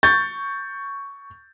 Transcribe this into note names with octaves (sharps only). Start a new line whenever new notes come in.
C#6 G6 A6